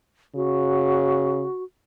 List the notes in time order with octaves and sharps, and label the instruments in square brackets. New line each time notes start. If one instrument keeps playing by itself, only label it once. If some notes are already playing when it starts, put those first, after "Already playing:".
[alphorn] C#3 [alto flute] F#4